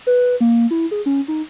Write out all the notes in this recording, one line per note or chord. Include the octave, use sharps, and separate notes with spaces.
B4
A#3
E4
G#4
C#4
D#4